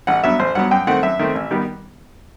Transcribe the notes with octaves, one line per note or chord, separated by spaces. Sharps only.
A1 F#5
G2 F#3 B3 E5
A1 C5
G2 F#3 B3 F#5
F#2 G5
D#3 A3 C4 F#5
F#2 E5
D#3 A3 C4
A1
D#3 G3 B3